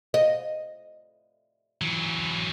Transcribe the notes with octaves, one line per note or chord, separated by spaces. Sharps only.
D#5
E3 F#3